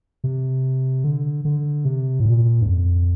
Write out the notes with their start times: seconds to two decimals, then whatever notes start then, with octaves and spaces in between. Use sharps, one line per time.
0.24 C3
1.04 D3
1.45 D3
1.85 C3
2.20 A2
2.25 A#2
2.61 G2
2.66 F2